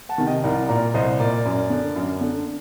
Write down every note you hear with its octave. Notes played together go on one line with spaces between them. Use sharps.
F#5 A5
C3 D#3
D#5 G5
C2 A#4 D5
A#2 A#4 D5
C2 C5 D#5
A#2 A#4 D5
F#2
D3
F#2
D3